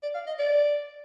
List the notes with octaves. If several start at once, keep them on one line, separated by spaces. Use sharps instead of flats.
D5
F5
D#5
D5